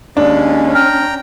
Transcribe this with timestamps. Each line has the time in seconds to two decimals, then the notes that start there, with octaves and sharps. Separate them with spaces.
0.17 D#2 G#3 C#4 D4
0.75 G5 A#5 F6